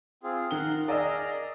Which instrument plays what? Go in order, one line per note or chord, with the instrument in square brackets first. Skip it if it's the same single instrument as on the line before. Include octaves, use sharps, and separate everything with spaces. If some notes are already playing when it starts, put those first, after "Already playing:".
[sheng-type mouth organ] C4 F4 G#4
[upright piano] D#3 G7 [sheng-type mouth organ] A#4 F5 F#5
[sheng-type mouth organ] G#4 A#4 A#5 [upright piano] D5 D#5 E6